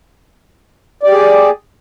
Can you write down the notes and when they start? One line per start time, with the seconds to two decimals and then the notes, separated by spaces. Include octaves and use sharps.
1.03 D5
1.07 G4
1.11 G#4